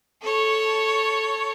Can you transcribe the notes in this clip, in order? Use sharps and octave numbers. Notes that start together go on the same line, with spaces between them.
A4 C#5